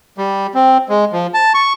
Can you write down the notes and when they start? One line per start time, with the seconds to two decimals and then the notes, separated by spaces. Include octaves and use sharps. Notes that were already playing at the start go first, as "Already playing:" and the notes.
0.18 G3
0.55 C4
0.89 G#3
1.12 F3
1.34 A5
1.54 C#6